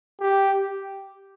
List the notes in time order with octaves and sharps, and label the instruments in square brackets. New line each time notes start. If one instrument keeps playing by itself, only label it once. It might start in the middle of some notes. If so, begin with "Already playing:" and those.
[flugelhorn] G4